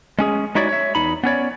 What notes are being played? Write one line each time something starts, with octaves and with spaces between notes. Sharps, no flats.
G#3 C#4 G#4
G#3 D#4 E4 F#4 C#5 D5
C#5 E5
E2 D#4 B5
B3 C#4 C#5 D5